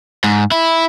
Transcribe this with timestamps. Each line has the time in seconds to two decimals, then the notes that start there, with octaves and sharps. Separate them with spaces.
0.24 G#2
0.52 E4